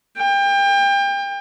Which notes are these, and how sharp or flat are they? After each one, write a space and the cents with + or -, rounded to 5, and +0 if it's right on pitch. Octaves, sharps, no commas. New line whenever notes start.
G5 +30